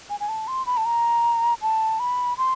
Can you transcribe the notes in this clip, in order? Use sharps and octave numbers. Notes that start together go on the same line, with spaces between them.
G#5
G#5
A5
C6
B5
A5
A#5
A5
B5
C6